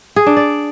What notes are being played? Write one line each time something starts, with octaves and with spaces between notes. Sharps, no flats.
G#4
D4
D5